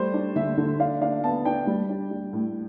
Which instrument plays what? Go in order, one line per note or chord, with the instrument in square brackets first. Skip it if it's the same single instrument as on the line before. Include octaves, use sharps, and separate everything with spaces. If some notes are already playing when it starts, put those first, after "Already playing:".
Already playing: [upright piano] G3 A3 C5
D4
D3 E5
D3
D4 F5
D4 F5
B3 A5
D4 G5
G3
D4
G3
A2